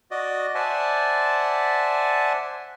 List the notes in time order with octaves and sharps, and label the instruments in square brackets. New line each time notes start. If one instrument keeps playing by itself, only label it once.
[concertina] F#4 D5 D#5
C5 D5 E5 F#5 G#5 A5